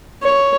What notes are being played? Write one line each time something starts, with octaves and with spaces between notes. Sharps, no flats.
C#5